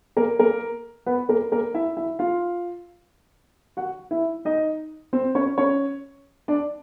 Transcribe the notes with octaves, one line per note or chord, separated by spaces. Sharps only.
A#3 A#4
A#3 A#4
B3 B4
A#3 A#4
A#3 A#4
E4 E5
E4 E5
F4 F5
F#4 F#5
E4 E5
D#4 D#5
C4 C5
C#4 C#5
C#4 C#5
D4 D5